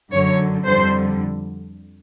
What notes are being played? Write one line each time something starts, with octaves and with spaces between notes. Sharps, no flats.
F#2 D3 F#3 C#5
F2 D3 G3 C5